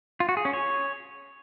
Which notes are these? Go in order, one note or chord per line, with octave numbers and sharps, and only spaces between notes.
F4
F#4
G#4
C#4
C#5